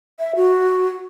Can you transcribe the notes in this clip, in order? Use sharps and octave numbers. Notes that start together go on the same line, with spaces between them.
E5
F#4